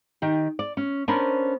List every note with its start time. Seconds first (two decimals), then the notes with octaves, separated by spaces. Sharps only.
0.22 D#3 G4
0.59 D5
0.77 C#4
1.08 B3 C#4 D4 A#4 C5